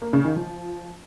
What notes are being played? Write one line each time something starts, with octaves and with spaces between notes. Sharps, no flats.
A#3
C#3
D#3
F3